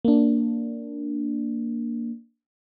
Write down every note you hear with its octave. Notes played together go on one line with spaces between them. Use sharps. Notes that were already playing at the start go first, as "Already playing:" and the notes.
A#3 D4